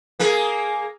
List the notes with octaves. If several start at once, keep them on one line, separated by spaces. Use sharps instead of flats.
A#3 G#4 A#4